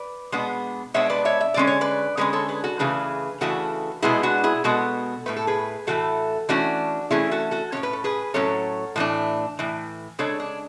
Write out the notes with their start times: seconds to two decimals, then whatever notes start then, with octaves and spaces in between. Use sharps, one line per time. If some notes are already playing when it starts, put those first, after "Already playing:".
Already playing: B4 D5
0.32 B2 G#3 B3 D4
0.94 B2 G#3 B3 D4 C#5 E5
1.10 B4 D5
1.25 C#5 E5
1.41 E5
1.54 D3 G#3 C#4 D5
1.67 C#5
1.81 B4 D5
2.17 D3 G#3 C#4 G#4 B4
2.33 A4 C#5
2.48 G#4 B4
2.64 F#4 A4
2.79 C#3 E3 A3 D4 G#4 B4
3.41 C#3 E3 A3 D4 F#4 A4
4.02 B2 G#3 B3 E4 G#4
4.23 D4 F#4
4.44 E4 G#4
4.64 B2 G#3 B3 F#4 A4
5.26 A2 E3 A3 B4
5.36 A4
5.47 G#4 B4
5.87 A2 E3 A3 F#4 A4
6.49 E3 A3 C#4 D4 F#4
7.11 E3 A3 C#4 E4 G#4
7.31 F#4 A4
7.51 F#4 A4
7.72 F#3 C#4 C#5
7.77 A2
7.83 B4
7.93 A4
8.04 G#4 B4
8.34 A2 F#3 C#4 A4 C#5
8.96 A2 E3 A3 D4
9.59 A2 E3
10.19 C#3 G#3 D4 A4 C#5
10.40 D4